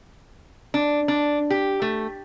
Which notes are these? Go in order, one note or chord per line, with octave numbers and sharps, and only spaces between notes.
D4
D4
G4
A3